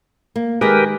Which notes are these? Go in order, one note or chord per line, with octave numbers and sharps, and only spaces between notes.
A#3
D#3 G#3 G4 G#4 A#4 B4